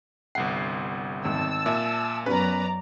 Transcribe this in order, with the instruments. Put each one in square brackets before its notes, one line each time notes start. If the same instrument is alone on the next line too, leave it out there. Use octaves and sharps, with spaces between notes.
[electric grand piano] G1 C2 C7 [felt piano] F#5
[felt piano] G#1 [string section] A5 E6
[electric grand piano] A#2 [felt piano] E5
[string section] F#2 D5 A#5 [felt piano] B3 C#4 [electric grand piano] B4